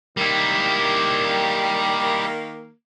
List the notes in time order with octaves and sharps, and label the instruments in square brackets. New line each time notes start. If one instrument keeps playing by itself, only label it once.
[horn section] D#3 A#3 [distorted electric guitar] G3 E4